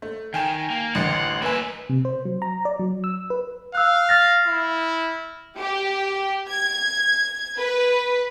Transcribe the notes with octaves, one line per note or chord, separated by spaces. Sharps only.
A3
D#3 G5 G#5 E7
A#3
A1 D2 F#5 C7
A#3 B4 E5 G#5
C3
C5
F#3
A#5
D5
F#3
E6
B4
F5 E6 F#6
F6 A6 A#6
E4
G4
G#6
B4